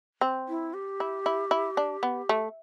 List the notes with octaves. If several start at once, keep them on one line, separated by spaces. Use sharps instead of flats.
C4
E4
G4
E4
E4
E4
D4
B3
A3